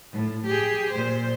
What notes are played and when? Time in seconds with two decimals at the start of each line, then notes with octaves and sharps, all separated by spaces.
0.13 A2
0.46 G4 G#4
0.91 A#2 C5